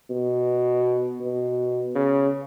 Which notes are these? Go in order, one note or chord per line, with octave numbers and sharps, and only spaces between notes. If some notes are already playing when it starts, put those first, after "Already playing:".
B2
B2
C#3